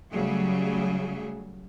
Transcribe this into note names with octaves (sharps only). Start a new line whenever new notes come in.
C#3 F#3 G3 A3 G#4